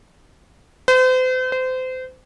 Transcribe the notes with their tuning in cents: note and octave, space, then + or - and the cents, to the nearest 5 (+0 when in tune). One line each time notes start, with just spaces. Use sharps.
C5 -40
C5 -30